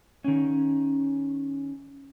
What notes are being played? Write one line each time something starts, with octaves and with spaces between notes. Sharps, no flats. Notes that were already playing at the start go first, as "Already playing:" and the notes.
D#3 C#4